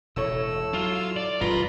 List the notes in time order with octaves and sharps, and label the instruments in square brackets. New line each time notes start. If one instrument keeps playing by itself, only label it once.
[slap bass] E1 A2 [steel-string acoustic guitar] E4 A4 C#5 [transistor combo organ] E6
[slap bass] F#3 [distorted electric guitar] F4
[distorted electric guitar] D5
[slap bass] D#1 F#2 G#3 [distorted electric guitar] F4 [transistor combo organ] B4 A#5